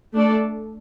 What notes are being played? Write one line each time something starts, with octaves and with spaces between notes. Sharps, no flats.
A3 D4 A4 D5